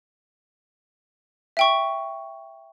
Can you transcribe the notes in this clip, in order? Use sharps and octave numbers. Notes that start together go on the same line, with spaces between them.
E5 G5 C#6